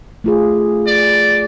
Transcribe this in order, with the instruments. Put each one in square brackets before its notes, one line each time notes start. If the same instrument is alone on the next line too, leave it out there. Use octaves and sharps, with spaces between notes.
[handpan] A3 F4 G#4
[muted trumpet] D5